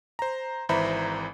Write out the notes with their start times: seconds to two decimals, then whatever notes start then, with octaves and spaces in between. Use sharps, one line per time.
0.19 C5 A#5
0.69 G#1 E3 C5 E5 A#5 B5